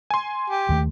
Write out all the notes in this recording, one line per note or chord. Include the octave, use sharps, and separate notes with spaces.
G#5 C6
G4
D#2 D#3 A3